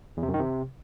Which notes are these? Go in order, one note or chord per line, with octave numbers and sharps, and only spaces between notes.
E2
C3
F#2
D#3
C3